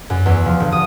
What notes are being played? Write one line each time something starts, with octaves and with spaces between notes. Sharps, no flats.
F#2
E2
F3
G1
D#6